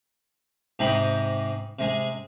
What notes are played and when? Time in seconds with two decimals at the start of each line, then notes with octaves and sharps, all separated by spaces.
0.79 G#2 C3 D#4 G4 G#5 B5
1.79 C3 G#3 G#5